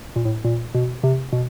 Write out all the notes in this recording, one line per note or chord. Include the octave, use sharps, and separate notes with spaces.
A#2
A2
A#2
B2
C3
B2